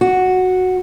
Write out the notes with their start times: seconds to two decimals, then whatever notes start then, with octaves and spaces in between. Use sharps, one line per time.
0.01 F#4